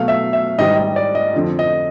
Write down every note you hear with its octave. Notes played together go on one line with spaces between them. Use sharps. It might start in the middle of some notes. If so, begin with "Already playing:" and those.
Already playing: B2 F#3 A3 F5
E5
E5
G#2 D#3 G3 D#5
D#5
D5
D#5
F2 D3 F3
D#5